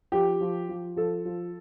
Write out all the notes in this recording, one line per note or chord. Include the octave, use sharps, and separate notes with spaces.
F3 G4
F3
F3
F3 A4
F3